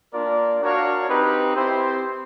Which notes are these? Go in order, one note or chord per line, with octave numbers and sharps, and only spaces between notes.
A#3 D4 F4 A#4 D5
D4 F#4 A#4 C#5 F5
C4 D#4 G4 B4
C4 E4 G4 C5